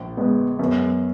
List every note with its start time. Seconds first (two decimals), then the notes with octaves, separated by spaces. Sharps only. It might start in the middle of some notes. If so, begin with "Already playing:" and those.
Already playing: A#1
0.17 G#3 B3
0.59 F#2 B3